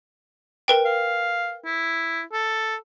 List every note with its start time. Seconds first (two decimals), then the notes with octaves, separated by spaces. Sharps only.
0.68 A#4 B4 G5
0.85 F5
1.65 E4
2.32 A4